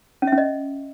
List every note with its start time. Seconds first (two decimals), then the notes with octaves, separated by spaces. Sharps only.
0.22 C#4
0.27 E5
0.33 C#4
0.38 D#5